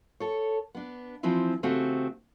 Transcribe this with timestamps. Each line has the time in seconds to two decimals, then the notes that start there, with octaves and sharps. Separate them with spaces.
0.20 A4 C#5
0.75 B3 D4
1.23 E3 F3 C4 E4
1.63 C#3 A3 C4 F#4 G4